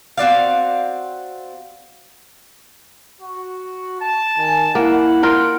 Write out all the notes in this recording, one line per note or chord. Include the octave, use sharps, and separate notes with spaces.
C4 F#4 D5 F5
F#4
A5
D#3 G#5
A#3 E4 F#5
F4 A#4 G5